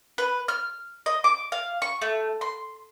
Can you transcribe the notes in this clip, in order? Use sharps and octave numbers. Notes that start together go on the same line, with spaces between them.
B4
F6
D#5
D6
F5
C#6
A3
C6